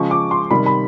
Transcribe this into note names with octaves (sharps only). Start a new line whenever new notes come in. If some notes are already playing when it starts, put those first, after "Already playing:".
Already playing: C#3 F3 G#3 C#6
D6
C6
C3 D#3 G3 B5
B5